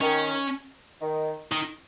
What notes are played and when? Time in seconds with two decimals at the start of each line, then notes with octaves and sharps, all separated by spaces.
0.01 D#3 C#4
1.02 D#3
1.52 D#3